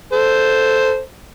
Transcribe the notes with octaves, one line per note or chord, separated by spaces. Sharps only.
A4 C5